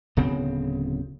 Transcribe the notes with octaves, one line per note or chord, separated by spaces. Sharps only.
D1 C#3 B3 C4